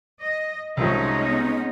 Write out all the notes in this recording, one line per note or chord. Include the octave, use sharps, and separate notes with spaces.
D#5
C2 F#2 F3 G#3 C#4 D#4
B3